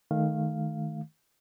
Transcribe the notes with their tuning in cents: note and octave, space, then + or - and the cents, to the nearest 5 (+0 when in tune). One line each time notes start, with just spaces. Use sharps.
D#3 +0 A3 -25 F5 +0